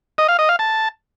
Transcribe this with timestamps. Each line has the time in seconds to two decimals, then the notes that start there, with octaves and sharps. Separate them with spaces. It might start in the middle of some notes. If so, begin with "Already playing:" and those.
0.18 D#5
0.28 F5
0.39 D#5
0.49 F5
0.59 A5